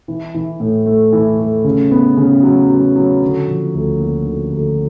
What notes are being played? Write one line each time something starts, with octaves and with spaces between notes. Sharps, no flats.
E3
E3
A2
A3
E3
A3
C#3
B3
C#3
F#3
F#3
F#3
D3
F3
D2
A#3
D3
D2